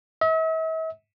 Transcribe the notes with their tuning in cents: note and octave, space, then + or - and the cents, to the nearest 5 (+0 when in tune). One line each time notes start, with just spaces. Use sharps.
E5 -45